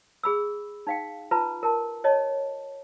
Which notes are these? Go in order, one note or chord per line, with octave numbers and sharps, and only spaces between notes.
G#4 B5 E6
D#4 F5 G5
F4 B4 A5 A#5
A#4 A5
C#5 D#5 A5